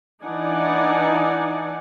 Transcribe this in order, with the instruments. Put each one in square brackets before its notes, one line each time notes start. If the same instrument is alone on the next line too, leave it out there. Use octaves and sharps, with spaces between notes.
[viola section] E3 D4 D#4 D5 F#5 G#5